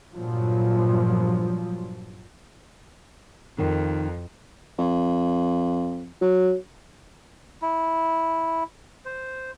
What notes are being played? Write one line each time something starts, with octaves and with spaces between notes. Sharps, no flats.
G2 A#2 F3 F#3
F2 D#3
F2
F#3
E4
C5